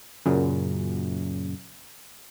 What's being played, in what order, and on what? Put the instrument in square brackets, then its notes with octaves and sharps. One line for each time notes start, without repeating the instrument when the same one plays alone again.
[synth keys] F#2 A#2 C#3